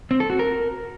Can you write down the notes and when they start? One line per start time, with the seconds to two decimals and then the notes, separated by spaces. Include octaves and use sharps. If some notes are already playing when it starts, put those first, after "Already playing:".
0.11 C4
0.20 A4
0.30 F#4
0.39 A#4